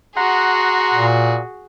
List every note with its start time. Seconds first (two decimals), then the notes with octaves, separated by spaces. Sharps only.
0.17 F#4 G#4 F#5 A#5 C6
0.94 A#2